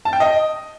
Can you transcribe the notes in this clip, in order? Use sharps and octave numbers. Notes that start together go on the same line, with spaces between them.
A5
G5
D#5